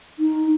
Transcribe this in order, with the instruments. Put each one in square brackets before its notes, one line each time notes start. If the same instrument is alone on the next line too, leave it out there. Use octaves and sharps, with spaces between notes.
[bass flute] D#4